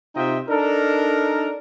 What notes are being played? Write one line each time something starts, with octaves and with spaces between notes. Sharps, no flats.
C3 D#4 F4 D#5 E5 G5
D4 D#4 A4 A#4